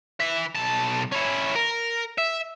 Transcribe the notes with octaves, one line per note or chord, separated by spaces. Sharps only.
E3 E5
B1 A5
C#4 E4
A#4
E5